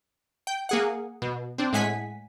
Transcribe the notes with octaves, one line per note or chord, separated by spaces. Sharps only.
G5
A#3 G#4 F#5
B2
C4 D4
A2 G#3 F#5 G#5 B6